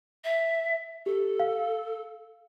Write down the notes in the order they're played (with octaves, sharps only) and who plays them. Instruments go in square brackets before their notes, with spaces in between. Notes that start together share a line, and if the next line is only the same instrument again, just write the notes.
[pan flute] E5
[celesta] G4 [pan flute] A4
[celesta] F5